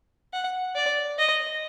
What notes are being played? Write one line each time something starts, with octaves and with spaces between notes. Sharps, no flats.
F#5
D5
D#5